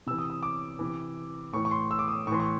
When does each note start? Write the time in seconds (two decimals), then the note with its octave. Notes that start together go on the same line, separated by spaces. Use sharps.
0.07 C3 E3 E6
0.19 D#6
0.30 D#6
0.43 D6
0.79 C3 E3
1.53 A2 E3 C#6
1.65 C#6
1.71 C6
1.91 E6
1.99 D6
2.08 D#6
2.27 A2 C#6
2.32 E3 C6
2.40 C#6